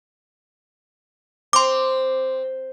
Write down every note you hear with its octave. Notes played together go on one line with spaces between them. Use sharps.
C4 C6 D6